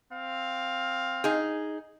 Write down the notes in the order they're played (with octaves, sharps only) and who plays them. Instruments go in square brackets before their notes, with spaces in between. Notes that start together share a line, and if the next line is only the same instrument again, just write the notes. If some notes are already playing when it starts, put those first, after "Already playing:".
[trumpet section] C4 F5
[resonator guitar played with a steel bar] D#4 G#4